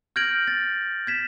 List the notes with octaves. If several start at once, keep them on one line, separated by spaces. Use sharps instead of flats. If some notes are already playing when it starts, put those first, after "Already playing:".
F6 G6 G#6 A#6 D7 F#7
A6
G#6 B6 E7